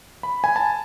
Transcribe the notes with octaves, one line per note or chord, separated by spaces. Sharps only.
B5
G#5
A5